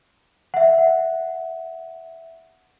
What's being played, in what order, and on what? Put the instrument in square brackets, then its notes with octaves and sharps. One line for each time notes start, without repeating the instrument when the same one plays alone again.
[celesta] E5 F#5